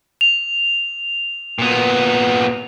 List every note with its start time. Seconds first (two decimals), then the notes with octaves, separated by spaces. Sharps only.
0.21 F7
1.59 A#2 B3